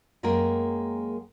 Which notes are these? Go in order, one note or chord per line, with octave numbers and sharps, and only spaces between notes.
F#2 G#3 A#3 G#4 A#4 G5